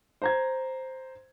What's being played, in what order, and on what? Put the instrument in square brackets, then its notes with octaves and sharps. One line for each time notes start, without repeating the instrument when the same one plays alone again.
[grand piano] C5 A#5 G#6